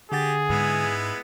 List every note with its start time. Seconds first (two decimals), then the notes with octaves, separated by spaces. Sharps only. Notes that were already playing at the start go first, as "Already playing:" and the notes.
0.12 D3 G4 G#4 F#5 A6
0.49 G#2 G#3 B3 E4